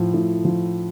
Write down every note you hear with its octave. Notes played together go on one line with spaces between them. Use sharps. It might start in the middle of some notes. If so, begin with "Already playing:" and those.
Already playing: A2 F3
A2
F3